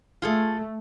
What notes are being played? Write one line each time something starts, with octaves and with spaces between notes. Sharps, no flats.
A3 F4 G#4 A4